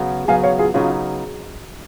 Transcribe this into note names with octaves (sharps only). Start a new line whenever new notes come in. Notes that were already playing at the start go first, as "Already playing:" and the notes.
Already playing: C#3 F#3 B3
C#3 F#3 B3 F5 G#5
C#5 F5
F4 G#4
C#3 F#3 B3 C#4 D#4 F4